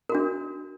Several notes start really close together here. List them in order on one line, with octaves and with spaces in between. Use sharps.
A#4 F#4 D4